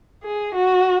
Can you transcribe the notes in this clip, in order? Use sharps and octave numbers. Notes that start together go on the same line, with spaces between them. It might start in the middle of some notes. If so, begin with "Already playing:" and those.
G#4
F#4